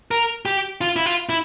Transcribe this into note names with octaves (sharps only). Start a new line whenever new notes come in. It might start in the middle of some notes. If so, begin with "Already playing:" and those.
A#4
G4
F4
E4
F4
E4